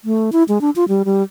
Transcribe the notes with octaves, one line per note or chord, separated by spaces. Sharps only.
A3
E4
G#3
D4
F4
G3
G3